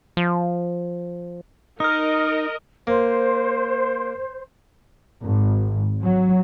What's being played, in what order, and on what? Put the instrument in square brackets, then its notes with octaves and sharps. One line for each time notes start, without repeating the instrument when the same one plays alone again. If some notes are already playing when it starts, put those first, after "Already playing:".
[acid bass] F3
[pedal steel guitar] D#4 [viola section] A#4 D#5 [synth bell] D#6 F6
[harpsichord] A#3 [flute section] C5
[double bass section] G#1
F#3